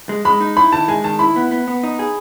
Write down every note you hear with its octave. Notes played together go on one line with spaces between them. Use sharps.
G#3
G#3 B5
D#4
E4 B5
D#3 A5
G#3 G#5
D#3 A5
E4 B5
B3
B3
B3
D#4
G#4